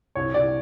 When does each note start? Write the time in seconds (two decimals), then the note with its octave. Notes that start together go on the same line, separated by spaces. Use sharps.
0.15 C2 C#5
0.34 C2 D5